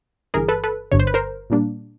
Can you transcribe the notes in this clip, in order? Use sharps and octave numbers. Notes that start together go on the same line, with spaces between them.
G1 G2 E3 G#4 A#4
A4 B4
A4 B4
G1 G2 D3 C#5
C5
B4
A#4 C5
A#2 G3 A#3 D4